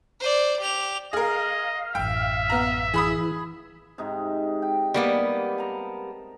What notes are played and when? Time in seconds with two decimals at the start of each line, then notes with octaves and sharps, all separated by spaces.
0.20 C5 D5
0.60 G4 F7
1.13 G#4 A#4 D#5 F5
1.95 A1 F#2 E5 G5
2.50 B3 A#5
2.94 E3 G#4 B5 D#6
3.98 G#2 C3 D#4
4.62 G5
4.94 G3 A#3 B3
5.58 A5 A#5